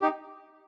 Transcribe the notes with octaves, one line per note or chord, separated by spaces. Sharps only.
D#4 G4